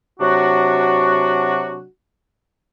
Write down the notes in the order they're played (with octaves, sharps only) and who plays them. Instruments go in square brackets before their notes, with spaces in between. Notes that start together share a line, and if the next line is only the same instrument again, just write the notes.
[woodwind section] C3 F#3 D4 F#4